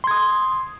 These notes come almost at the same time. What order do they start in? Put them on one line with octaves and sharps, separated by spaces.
C6 G#6 D#6